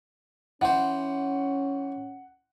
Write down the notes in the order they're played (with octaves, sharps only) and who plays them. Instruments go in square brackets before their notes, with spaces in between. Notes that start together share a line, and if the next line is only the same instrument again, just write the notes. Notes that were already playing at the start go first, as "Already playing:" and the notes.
[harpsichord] E3 C5 [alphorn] C#4 [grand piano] F#5